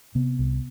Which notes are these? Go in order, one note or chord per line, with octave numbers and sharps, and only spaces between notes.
C3 B3
C2